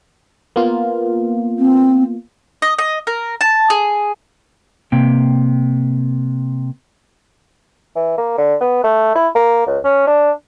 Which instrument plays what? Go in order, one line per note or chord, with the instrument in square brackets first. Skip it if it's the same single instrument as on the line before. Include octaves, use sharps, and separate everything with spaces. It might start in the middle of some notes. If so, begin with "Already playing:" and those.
[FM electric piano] A#3 B3 F4
[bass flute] C4
[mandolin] D#5
D#5
A#4
A5
G#4
[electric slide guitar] C3 A#3 G5
[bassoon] E3
A#3
D3
B3
A3
E4
A#3
C#2
C#4
D4